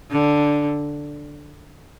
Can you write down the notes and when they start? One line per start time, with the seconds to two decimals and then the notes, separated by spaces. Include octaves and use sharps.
0.11 D3